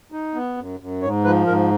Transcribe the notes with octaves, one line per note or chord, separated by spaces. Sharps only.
D#4
B3
F#2
F#2
G#2 C#5
F3 B4
G#2 A#4